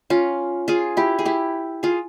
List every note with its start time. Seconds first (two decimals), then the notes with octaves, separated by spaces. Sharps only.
0.10 C#4 F4
0.68 F4 G#4
0.97 E4 G4
1.19 G#4
1.25 E4 G4
1.83 F4 G#4